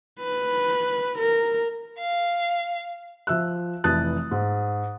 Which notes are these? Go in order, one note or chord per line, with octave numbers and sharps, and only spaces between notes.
B4
A#4
F5
F3 E5 E6 F#6
F1 E3 A5 D#6 F#6 A6
G#2